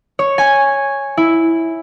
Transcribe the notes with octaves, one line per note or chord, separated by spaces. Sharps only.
C#5
G#5
E4